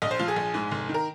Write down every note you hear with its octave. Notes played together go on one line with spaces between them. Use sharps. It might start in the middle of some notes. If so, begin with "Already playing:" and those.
A#1 D#5
C5
F3 F4
G#4
A#1
G#2
F1
D#3
A#4